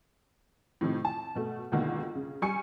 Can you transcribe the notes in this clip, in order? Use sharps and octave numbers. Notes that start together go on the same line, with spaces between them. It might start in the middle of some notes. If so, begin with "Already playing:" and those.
A2 C3 D#3 F3
A5
B2 A3
C#2 B2 D3 D#3 A#3
C#3
G3 G#5 C#6 C#7